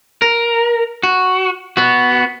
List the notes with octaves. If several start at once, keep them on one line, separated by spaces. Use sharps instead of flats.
A#4
F#4
B3 F#4